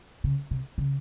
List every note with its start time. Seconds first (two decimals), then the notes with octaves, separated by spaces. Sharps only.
0.24 C#3
0.51 C3
0.78 C#3